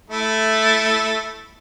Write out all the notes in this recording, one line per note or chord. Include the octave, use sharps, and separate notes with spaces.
A3 E4